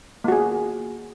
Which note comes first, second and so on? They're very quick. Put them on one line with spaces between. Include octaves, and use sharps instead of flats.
A#3 F#4 G#4